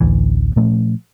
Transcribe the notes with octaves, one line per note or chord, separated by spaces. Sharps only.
A1 D2 E3
A#2 F3 A3 C#4